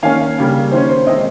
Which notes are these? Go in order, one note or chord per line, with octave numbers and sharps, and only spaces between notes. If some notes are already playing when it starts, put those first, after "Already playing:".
D#3 A#3 C#4 F5 G#5
C#3 G3 A#3
D#3 A#3 C#4 C5
C5
C3 D#3 G#3 C5 D#5